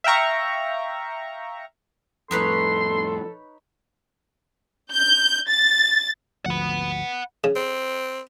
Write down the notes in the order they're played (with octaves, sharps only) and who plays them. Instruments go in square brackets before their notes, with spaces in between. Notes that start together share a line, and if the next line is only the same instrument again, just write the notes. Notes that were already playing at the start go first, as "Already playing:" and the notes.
[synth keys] E5 F5 G5 A#5 C#6
[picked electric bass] F2 A2 [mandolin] D#4 B4 C#5 [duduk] A4 [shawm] C6
[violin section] G6
A6
[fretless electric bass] G#1 D2 F3 [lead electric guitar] F#5 B5
[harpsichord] C#3
[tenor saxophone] C4